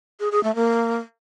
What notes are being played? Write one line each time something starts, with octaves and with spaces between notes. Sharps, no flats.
G#4
G#4
A3
A#3